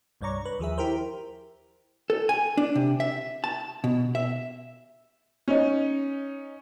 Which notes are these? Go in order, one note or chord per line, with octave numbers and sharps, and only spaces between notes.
C2 G2 C#5 D5 A#5 C#6
B4
D#2 F3 G#4 E5
E4 G4 A#4 C5
A4
G#5
D4
C3
E5
A5
B2
E5
C#4 D#4